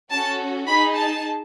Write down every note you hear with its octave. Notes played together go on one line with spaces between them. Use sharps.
C#4 F#4 A4 A5
D#4 G#4 B5
A5